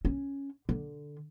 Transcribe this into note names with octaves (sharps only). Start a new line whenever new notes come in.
C#4
D3